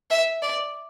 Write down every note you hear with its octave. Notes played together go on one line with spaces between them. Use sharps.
E5
D5